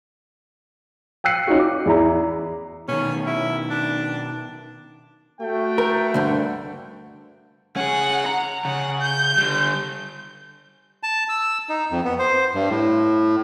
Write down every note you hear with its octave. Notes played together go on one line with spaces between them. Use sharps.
G5 E6 F#6 C7 C#7
C#4 D#4 F4 F#4
D6
E2 E4 A#5
B2 D#3 C#4
E4
D4
A3 F#4 G5
A#4
D2 G2 D3
C#4 G#4 F#5
A#5
C#3 F#5
G6
D3 G3
A5
E6
D#4
F2
B3
C5
G2
A2